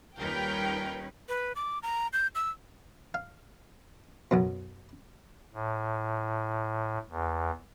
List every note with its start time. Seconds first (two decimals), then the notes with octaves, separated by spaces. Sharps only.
0.18 D#2 G3 C#4 D#4 F4 A#4 B4 G5
1.29 B4
1.56 D6
1.83 A#5
2.13 G6
2.35 E6
3.14 F5
4.31 B1 F#2 B2
5.54 A2
7.10 E2